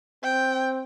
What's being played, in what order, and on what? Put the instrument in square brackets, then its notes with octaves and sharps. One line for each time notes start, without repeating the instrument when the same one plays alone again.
[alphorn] C4 [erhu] G5